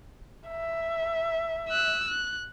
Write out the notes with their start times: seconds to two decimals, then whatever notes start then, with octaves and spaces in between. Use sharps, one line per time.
0.48 E5
1.69 E6 F#6
2.08 F#6